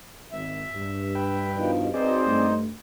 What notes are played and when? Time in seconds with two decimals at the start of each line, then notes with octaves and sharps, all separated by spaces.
0.32 G#1 E5
0.74 G2
1.15 B4 G5
1.54 B2 D#3 F3
1.94 C4 D#4 F#4 G#4 B4 C5 D5 D#5
2.26 G2 A3